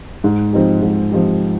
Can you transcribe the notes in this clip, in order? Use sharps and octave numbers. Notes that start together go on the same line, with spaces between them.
G#2
F3 C4 D#4 G4
G#2
F3 C4 D#4 G4